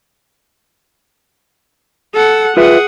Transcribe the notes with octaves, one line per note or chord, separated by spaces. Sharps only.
A4 F#5
F4 G#4 B4 E5 F#5